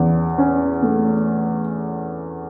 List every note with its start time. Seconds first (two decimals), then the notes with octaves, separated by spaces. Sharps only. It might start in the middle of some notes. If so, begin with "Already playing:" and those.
Already playing: E2 C#4
0.38 C#4
0.82 A3